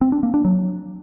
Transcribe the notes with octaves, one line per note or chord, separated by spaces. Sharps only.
C4
D4
A#3
D4
F#3